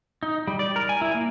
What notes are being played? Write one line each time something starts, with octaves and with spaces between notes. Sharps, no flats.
D#4
G3
D5
A#4
G#5
E4
A#3